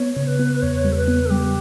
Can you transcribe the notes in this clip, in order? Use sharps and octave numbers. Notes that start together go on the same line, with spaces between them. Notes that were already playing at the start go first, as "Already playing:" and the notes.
Already playing: B3 C#5
C#3
B4
B3
E2 C#5
G3
A4
B4
B3
A4
G3 G4